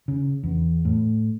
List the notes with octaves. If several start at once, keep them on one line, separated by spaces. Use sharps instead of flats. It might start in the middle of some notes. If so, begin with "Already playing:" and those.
C#3
E2
A2